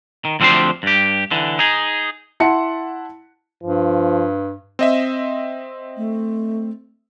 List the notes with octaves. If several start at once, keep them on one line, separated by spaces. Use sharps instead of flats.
D#3
D2 F3 C4 D4 G4 C6
G2 G4
D3 E3
D#4 G#4
E4 F#5 A5 C6 C#7
G2 F3
C4 D#5 E5
A3